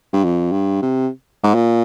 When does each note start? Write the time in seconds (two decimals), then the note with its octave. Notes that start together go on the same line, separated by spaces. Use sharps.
0.13 G2
0.24 F2
0.52 G2
0.82 C3
1.43 G#2
1.54 A#2